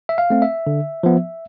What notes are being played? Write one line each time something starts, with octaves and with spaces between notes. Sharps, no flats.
E5
F5
A3 C4
E5
D3
F3 B3